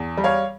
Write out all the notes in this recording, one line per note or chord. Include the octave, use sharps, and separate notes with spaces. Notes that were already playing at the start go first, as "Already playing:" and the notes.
Already playing: E2
G3
C#5 F5